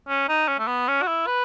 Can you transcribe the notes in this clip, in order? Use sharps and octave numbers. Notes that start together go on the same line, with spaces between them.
C#4
D#4
C#4
A3
B3
C#4
F#4
E4
B4